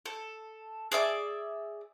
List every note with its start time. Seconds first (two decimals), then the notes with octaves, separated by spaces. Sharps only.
0.06 A4
0.92 G#4 D5 E5 D6